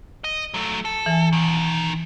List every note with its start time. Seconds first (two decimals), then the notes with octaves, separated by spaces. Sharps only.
0.24 D#5
0.54 F#3 A3
0.85 A4
1.06 E3 G#5
1.33 B2 D#3